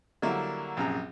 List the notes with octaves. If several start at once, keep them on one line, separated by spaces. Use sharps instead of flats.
D3 F#3 G3 A#3 E4
A#1 F#2 C3 G#4 A#5